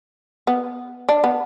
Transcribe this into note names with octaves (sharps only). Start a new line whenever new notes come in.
B3
D4
B3